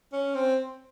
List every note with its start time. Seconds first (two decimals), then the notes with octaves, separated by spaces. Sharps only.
0.13 C#4
0.35 C4